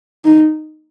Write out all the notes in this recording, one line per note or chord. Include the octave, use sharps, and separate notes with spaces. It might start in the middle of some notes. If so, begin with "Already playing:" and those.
D#4